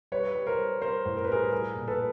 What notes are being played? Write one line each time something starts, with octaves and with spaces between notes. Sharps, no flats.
G3 B4 C#5
G3
A#4 C5
G3
G3 A#4 C5
A2
A#4
B4
G3 G#4 A#4
G3 G#4 A#4
A#2
A4 B4